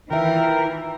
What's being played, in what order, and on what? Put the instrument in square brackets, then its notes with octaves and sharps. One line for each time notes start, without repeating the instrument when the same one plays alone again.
[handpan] D#3 F4 E5 [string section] E3 [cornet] A#4 [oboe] G5